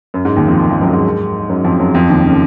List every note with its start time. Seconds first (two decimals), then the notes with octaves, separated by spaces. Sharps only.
0.14 F#2
0.25 G#2
0.36 D#2 D#3
0.48 F2 F3
0.70 F2 F3
0.81 F#2 F#3
0.93 G#2 G#3
1.49 F#2 F#3
1.64 F2 F3
1.80 F#2 F#3
1.94 F2 F3
2.10 D#2 D#3
2.25 C#3